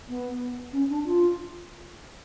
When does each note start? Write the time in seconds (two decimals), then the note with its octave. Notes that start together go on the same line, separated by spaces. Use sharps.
0.09 B3
0.73 C#4
0.90 D4
1.05 F4